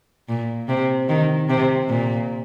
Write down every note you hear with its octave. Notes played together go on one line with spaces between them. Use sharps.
A#2
C3
D#3
C3
A#2